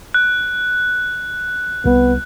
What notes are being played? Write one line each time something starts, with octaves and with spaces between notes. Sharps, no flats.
F#6
C2 B3